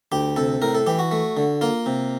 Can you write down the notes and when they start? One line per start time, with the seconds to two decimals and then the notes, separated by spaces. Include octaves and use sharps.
0.12 D2 G4
0.36 C3 A4
0.62 A2 A#4
0.75 A4
0.87 E3 G4
0.99 F#4
1.11 A3
1.37 D3
1.61 A#3 F4
1.86 C3